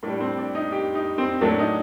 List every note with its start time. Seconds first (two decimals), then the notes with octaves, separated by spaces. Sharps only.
0.03 A2 G3 D4
0.20 C4
0.38 D4
0.55 D#4
0.72 G4
0.95 D#4
1.18 C4
1.41 A2 F#3 A3 D4
1.59 D#4